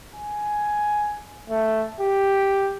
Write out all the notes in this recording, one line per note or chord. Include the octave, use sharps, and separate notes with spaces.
G#5
A3
G4